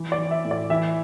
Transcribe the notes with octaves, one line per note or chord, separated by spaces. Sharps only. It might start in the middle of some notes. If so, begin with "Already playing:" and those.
Already playing: E3
D5
E3
E5
A2
D5
E3 E5